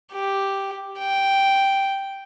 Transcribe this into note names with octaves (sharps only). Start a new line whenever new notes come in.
G4
G5